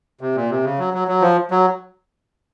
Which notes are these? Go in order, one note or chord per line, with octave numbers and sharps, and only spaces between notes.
C3
A#2
C3
C#3
F#3
F#3
F#3
F3
F#3